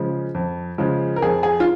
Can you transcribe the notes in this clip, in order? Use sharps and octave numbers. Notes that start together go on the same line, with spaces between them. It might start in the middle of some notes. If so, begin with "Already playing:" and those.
Already playing: C#3 F3 G#3
F2
C#3 F3 G#3
A#4
F2 G#4
G#4
F4